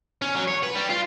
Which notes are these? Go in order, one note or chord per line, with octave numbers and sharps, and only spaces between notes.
C#4
F#3
C#5
B4
G3
F4